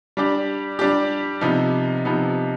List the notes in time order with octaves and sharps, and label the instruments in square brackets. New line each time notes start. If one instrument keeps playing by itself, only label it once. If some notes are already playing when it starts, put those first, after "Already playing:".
[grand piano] G3 D4 G4
G3 D4 G4
C3 F3 B3 D#4
C3 F3 B3 D#4